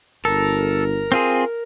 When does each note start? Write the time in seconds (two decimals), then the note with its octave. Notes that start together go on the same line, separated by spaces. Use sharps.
0.25 G1 A4 A#4
1.12 C4 F4 G#4